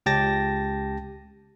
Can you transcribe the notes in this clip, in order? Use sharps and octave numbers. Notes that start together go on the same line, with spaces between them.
C#2 G4 G5 A5 A6 A#6